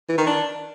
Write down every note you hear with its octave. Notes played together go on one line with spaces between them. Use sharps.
E3
D#3
D4